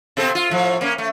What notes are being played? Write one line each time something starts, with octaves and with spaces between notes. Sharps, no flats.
B2 C4 A4
F4
A2 F3
A#3 C#4
A3